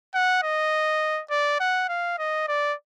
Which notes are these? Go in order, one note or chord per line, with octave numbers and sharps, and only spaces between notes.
F#5
D#5
D5
F#5
F5
D#5
D5